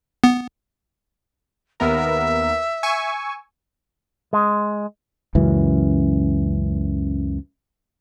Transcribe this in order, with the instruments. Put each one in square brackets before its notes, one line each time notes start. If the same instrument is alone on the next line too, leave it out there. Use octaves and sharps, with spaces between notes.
[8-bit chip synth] B3
[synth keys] D#2 B3 A#4 [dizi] E5
[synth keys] G#5 C#6 E6
[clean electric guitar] G#3
[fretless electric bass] C#2 F#2 E3